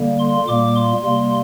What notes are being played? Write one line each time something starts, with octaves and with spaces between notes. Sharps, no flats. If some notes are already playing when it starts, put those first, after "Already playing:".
Already playing: D3 G3 A#3
C6
A#2 G3 A#3 D6
C6
C3 G3 A#3